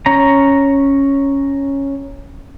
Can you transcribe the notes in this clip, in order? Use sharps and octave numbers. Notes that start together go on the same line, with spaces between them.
C#4 C#5 A#5